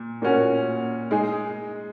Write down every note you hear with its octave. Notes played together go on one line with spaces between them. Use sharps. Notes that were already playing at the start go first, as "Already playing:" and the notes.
Already playing: A#2
A#2 A#3 C#4 F#4
G#3 D#4 G#4